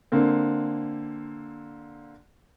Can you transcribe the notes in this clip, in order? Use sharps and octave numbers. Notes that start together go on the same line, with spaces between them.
D3 A#3 C4